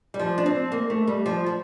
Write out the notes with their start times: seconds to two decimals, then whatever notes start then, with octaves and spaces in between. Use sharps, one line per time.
0.14 G3
0.19 F3
0.38 D4
0.46 C4
0.72 A#3
0.90 A3
1.07 G3
1.26 F3
1.46 F3